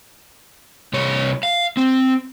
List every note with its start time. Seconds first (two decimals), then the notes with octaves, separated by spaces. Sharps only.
0.93 C2 C#5
1.43 F5
1.77 C4